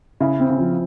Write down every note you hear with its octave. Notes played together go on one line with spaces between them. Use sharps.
C#3 E4
C4
C#3
F3